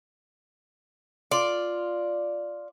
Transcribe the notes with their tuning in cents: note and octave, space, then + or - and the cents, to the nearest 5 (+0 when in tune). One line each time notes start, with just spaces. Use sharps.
F4 +0 D5 +0